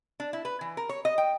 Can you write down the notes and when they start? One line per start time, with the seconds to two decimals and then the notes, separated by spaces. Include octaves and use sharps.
0.20 D4
0.33 E4
0.45 B4
0.61 E3
0.77 A#4
0.89 C#5
1.05 D#5
1.18 G5